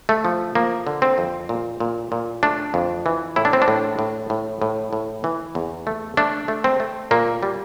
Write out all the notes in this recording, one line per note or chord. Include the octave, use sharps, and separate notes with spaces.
A3
F3
F3 A#3
D3
C4
F2
A#2
A#2
A#2
A3 D4
F2
E3
A2 E4
D4
C4
D4
A2
A2
A2
A2
A2
E3
E2
A3
A3 D4
A3
C4
A3
A#2 A#3
G3